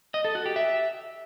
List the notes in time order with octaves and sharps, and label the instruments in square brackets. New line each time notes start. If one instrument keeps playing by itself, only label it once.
[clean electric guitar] D#5
A4
F#4
G4
E5